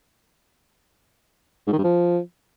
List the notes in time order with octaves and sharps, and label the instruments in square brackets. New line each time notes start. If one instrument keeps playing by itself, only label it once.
[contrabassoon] G#2
D#3
G2
F3